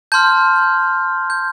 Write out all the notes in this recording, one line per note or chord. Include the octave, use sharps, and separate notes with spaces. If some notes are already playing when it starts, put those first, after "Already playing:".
A5 C6 F6 G6
G6